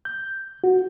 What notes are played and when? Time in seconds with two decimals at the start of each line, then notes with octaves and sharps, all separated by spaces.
0.05 G6
0.64 F#4